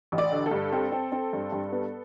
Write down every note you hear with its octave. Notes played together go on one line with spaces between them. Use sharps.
A1
D5
D3
A4
G2
C4 A4
C4
C4
G2
G2
B3